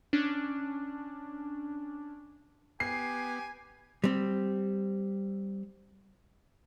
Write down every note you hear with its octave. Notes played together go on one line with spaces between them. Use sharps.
C#4 D4
B3 G4 G#5 C7
G3 C4